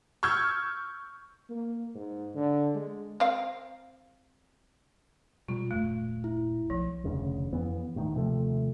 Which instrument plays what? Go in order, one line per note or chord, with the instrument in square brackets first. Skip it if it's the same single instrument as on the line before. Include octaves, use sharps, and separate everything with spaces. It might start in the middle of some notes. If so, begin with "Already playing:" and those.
[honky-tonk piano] C#6 E6 F6 G6 G#6
[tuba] A#3
G#2
D3
G#3
[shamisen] C4 A#4 F5
[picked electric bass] B2 G3 G#3 [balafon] F4
[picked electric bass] D#1 F#2 A#2 [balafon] A3
[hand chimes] E4
[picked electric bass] B1 [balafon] F3
[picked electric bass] F1 D2 C#3 C#4
F2 E3 B3
D#1 A2 D3 D#3
D#2 C3 F3 A3